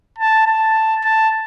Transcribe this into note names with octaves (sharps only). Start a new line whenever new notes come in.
A5
A5
A5